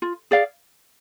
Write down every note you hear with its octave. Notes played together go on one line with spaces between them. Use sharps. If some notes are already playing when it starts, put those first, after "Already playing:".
F4
G#4 D5 F5